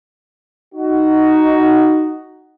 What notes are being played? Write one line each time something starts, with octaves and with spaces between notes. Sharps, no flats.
D#4 F#4